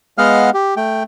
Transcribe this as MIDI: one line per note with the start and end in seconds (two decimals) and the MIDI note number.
0.18 0.50 56
0.18 0.50 59
0.18 0.50 75
0.18 0.50 77
0.18 0.50 78
0.18 0.50 89
0.54 0.75 67
0.77 1.03 57
0.77 1.03 79